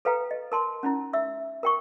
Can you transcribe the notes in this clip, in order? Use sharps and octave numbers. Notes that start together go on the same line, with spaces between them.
A4 B4 F5 G5 A#5
D#5
A#4 A5 C6
C#4 D#4 E4
E5 E6
A#4 G5 C#6